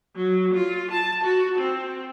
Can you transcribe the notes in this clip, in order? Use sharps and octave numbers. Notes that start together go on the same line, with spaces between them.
F#3
F4
A5
F#4
C4